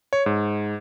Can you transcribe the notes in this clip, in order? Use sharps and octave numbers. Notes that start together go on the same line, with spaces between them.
C#5
G#2